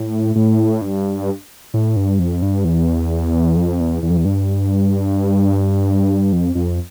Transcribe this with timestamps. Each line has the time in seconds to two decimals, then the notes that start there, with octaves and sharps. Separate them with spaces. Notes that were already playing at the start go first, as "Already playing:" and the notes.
Already playing: A2
0.36 A2
0.82 G2
1.74 A2
1.96 G2
2.19 F2
2.42 G2
2.65 E2
3.56 F2
3.80 E2
4.03 E2
4.10 F2
4.17 E2
4.25 G2
6.33 F2
6.55 F2